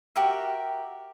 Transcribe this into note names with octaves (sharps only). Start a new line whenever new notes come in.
F#4 G4 A#4 E5